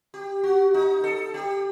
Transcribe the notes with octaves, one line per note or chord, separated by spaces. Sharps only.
G4
F#4
D#4
A4
G4